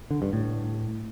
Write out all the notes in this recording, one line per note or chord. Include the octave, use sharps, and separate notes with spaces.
D3
G2
A2